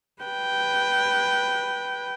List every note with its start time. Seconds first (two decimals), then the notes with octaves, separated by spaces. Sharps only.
0.23 B4 G5